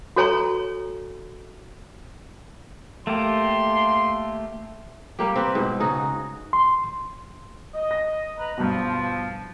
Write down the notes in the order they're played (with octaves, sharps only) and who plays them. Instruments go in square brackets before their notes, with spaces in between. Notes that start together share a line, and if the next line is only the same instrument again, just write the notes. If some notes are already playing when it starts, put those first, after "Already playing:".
[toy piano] F#4 A4 C#5 G#5 A#5 C#6
[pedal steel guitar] A3 A#3 G4 [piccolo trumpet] C6
[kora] G3 A#3 G4
C4 B4
G#2 B2
C#3 D#4 F#4
[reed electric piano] C6
[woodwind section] D#5
[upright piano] A#6
[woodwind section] B4 A#5
[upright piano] G2 B2 [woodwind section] F3